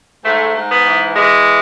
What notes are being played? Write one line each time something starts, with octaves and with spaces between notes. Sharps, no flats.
G#2 A3
G#2
B3
E3
E3 G#3